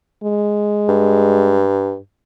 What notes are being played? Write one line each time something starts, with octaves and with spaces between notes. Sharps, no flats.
G#3
G2